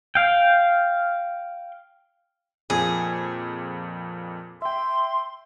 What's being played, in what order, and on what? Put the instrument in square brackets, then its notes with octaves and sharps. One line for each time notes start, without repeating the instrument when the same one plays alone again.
[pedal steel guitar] F5 G5
[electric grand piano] F2 A#2 [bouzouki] G#4
[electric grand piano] E5 G5 [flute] C6